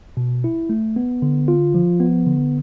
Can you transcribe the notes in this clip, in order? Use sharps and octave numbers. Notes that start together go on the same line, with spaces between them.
B2
E4
A3
B3
D3
F4
F3
B3
D3